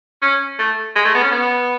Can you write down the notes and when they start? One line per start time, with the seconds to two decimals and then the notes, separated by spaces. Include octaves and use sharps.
0.22 C#4
0.59 A3
0.96 G#3
1.05 A3
1.15 B3
1.23 C#4
1.32 B3